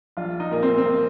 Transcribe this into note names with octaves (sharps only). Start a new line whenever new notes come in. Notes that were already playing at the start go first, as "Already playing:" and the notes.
A#1 F4
D#4
A#2 A#3
C4
C4
A#3